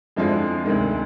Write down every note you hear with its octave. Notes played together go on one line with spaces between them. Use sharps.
F2 D3 F3 G#3 D4 E4
D2 C3 D#3 G#3